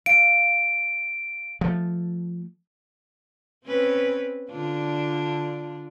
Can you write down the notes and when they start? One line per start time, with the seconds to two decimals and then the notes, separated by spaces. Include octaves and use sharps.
0.06 F5 D7
1.61 F3 A3
3.65 C4 C#4 B4
4.50 D3 D4 F4